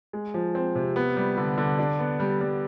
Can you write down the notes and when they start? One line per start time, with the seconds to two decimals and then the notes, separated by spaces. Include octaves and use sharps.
0.13 G#3
0.34 F3
0.55 C4
0.75 C3
0.96 B3
1.17 G3
1.37 D3
1.58 D3
1.79 D4
1.99 B3
2.20 G3
2.41 G3